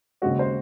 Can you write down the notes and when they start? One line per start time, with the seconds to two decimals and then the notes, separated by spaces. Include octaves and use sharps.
0.22 D#2 C#3 G#3 C4 F#4
0.39 C5